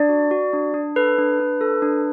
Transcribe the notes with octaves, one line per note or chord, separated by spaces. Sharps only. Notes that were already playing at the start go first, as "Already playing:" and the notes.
Already playing: D4 D5
F#4
F#4
D4
D4
A4 B4
D4
D4
A4
D4